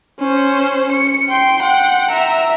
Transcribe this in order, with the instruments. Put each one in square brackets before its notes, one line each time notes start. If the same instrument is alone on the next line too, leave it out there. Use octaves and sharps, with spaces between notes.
[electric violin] C#4 C5
C#7
G5 C6
F#5 G5
E5 A#5